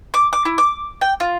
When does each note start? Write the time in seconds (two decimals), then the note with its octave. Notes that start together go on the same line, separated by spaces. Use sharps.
0.14 D6
0.33 D6
0.45 E4
0.58 D6
1.01 G5
1.20 F4